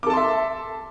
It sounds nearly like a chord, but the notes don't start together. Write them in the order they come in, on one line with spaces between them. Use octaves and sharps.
D6 A4 A5 C6 E5